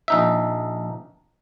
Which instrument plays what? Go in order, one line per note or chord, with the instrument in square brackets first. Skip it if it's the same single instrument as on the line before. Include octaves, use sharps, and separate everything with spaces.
[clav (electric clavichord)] A#1 D#4 E5